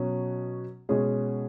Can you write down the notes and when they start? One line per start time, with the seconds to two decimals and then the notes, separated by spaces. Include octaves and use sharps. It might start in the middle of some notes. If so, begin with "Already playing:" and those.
Already playing: B2 F#3 C#4
0.89 B2 G#3 C#4 G#4